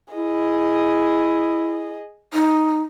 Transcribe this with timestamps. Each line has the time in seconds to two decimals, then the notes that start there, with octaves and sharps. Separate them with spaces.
0.14 E4 G#4 D#5
2.34 D#4